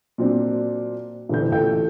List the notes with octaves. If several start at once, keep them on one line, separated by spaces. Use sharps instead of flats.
A#2 F#3 C4 D4
D#1 D3 E3 G6
A1 F4 A4 G5 G6